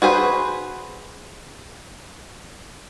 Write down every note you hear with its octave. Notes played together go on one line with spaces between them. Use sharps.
F#4 G#4 B4 C5